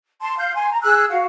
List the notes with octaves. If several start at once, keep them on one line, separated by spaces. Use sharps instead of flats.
A5 C6
F5 G6
G#5 C6
A#5
G#4 E6 F#6
F#4 F5